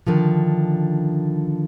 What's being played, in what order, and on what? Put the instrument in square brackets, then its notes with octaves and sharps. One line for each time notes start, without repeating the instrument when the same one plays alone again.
[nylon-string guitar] D3 D#3 F3